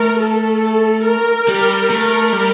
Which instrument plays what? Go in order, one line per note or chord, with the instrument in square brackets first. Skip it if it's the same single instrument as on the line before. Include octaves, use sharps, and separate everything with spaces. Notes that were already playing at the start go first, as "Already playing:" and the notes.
Already playing: [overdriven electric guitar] A3 [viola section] A#4
[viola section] A4
A#4
[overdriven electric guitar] G3
A3
G3